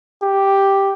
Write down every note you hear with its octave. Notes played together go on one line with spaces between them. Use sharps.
G4